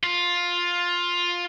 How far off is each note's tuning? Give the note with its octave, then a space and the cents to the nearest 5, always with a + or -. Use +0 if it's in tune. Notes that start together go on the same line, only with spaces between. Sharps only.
F4 +10